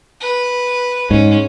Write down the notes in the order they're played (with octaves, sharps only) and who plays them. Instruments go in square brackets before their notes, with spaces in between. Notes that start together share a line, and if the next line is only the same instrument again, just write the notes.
[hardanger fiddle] B4
[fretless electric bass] G#2 [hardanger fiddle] C#4